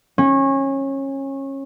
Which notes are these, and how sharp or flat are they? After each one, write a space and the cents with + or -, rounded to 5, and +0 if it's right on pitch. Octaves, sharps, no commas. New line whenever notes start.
C#4 -25